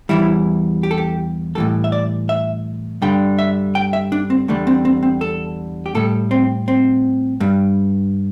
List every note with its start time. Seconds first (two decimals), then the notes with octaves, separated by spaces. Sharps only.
0.09 E2 E3 G3 E4
0.83 G4
0.91 A4
0.98 G4
1.55 A2 E3 G3 A4
1.84 E5
1.92 D5
2.29 E5
3.02 G2 D3 G3 G5
3.39 E5
3.75 G5
3.93 E5
4.12 D4
4.30 C4
4.48 E2 D3 G3 A3
4.67 C4
4.85 C4
5.03 C4
5.21 A4
5.86 G4
5.95 A2 G3 A4
6.31 C4
6.68 C4
7.40 G2 G3